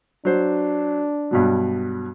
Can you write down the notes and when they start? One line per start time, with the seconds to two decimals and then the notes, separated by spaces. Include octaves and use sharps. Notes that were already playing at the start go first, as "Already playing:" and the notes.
0.25 F#3 D4 C5
1.31 G2 B2 F#3